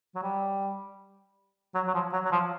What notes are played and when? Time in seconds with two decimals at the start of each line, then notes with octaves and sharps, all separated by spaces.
0.15 F#3
0.23 G3
1.75 F#3
1.87 F#3
1.94 F3
2.13 F#3
2.25 F#3
2.32 F3